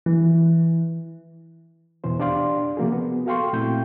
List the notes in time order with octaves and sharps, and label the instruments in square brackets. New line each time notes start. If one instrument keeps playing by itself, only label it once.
[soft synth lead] E3
[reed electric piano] E2 B2 E3 C5
D4 G4 D5 F5 C6
C3 F3 A#3 F#4 G#4
B3
F#4 A4 F5 G5 C6 C#6
A#2 A3 C4 E4 G5 G6